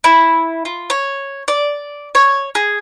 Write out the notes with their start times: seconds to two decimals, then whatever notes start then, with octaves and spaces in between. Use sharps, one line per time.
0.04 E4
0.65 F4
0.90 C#5
1.48 D5
2.15 C#5
2.55 G#4